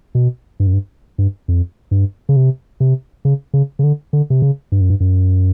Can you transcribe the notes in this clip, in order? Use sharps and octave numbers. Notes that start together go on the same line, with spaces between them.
B2
G2
F#2
G2
G2
F2
G2
C#3
C3
C3
C#3
C#3
C#3
D3
D3
C3
C#3
G2
F#2
G2
F#2